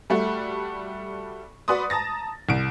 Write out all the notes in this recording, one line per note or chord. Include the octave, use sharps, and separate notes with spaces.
G3 A3 F#4
F#4 B4 D5 C6 D#6
A5 A#5 D#6 A6 A#6
C2 D7